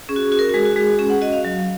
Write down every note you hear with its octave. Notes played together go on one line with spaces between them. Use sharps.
C#4 G#4
F#4
G#4
F#4
A#4
F#4
G#3 G#4
F#4
G#3 G#4
F#4
C#4 G#4
F#5
F#4 D#5
F5
F#3